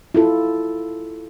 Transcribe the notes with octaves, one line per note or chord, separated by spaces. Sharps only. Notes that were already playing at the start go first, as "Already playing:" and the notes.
E4 F4 A4